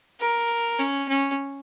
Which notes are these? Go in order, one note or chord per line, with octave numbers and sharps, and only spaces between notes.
A#4
C#4
C#4